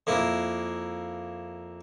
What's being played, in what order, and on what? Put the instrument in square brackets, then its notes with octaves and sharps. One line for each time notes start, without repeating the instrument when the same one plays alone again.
[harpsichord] F2 A#3 E4